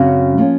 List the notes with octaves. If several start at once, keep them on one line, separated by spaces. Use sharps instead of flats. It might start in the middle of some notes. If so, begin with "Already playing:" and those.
Already playing: F#2 C#3 F#3 C4 F#4
F3 A#3 C#4